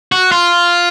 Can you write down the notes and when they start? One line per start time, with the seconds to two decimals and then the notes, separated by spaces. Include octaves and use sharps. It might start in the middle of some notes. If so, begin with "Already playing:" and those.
0.12 F#4
0.32 F4